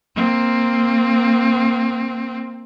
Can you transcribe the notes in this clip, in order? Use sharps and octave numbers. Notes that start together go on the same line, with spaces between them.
A#3 C4